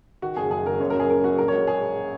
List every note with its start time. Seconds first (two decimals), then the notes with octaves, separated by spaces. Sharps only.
0.22 D#3 F#4
0.36 F#1 G#4
0.51 F#2 G#4
0.66 F#1 A#4
0.80 F#2 C#5
0.90 A#4
0.94 F#2
1.00 G#4
1.09 F#2 A#4
1.23 F#2 F#4
1.38 A#1 A#4
1.48 C#5
1.53 G#3
1.67 G#4